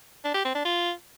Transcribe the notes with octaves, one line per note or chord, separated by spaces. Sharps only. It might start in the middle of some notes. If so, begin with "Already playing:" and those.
D4
G4
C4
D4
F4